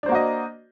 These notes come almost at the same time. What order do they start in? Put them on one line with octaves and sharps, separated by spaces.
D4 C5 A#3 F#4 D#5